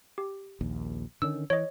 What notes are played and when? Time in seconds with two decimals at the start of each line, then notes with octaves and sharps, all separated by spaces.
0.18 G4
0.61 A#1 D#2
1.22 D3 D#3 C#4 E6
1.50 E3 C#5 D#5